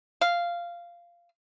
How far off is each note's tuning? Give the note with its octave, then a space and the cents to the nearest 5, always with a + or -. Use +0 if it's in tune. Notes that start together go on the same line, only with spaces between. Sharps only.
F5 -10